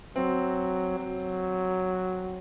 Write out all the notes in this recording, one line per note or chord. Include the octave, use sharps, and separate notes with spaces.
F#3 C4
F#3